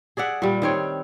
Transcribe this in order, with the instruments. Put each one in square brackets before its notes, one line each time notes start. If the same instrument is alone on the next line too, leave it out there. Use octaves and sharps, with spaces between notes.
[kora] G#4 D5 E5 F#5
A#2 G3
D#3 C4 C#5